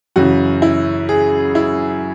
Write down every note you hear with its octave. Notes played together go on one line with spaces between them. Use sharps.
F#2 C#3 E3 F#4
E4
G#4
E4